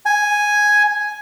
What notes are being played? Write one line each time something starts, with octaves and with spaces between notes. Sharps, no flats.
G#5